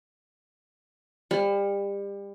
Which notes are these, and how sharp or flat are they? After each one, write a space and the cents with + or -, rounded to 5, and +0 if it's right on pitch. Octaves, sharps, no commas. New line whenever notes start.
G3 +30